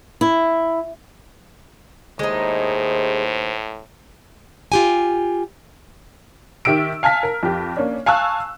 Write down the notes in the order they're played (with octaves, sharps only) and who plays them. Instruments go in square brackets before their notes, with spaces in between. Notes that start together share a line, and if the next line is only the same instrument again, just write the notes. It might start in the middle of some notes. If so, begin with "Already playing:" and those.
[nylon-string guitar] E4
[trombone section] D#2 C5 [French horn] A2 [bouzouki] G#3 D#4
[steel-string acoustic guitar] F4 G4 G#5
[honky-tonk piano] D#3 G4 E5 E6 D7
F5 G#5 A5 F6 B6
A#4
F2 G4
A#3 C#4 D4
F5 G#5 A5 C#6 E6 F#6